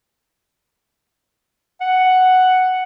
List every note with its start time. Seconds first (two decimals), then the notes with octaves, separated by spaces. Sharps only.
1.81 F#5